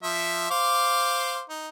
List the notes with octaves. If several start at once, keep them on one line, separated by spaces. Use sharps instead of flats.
F3 E5
C5 F5 D6
D#4